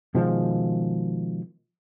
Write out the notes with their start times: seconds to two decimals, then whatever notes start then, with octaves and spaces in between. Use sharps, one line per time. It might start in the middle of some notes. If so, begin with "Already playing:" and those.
0.15 B2 D#3 F3 G#3